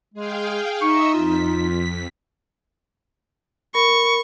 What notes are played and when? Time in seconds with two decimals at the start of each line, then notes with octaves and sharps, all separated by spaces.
0.14 G#3 G#4 F5 G5
0.82 D#4 D#5 E5 C#6 E6
1.14 F2 F4 B6
3.75 A#4 B5 C#6